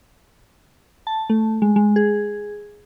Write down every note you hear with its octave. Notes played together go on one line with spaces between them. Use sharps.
A5
A3
G#3
G#3
G#4